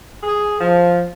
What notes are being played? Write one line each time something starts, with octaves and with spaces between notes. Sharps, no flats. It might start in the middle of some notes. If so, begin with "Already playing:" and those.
G#4
F3